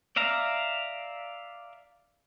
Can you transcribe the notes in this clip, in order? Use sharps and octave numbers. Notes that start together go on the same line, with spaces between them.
D5 E5 F5 A#5